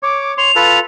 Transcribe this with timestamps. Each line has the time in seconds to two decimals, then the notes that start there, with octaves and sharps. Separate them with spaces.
0.03 C#5 D6
0.38 C#5 C6 F7
0.56 F4 A4 B4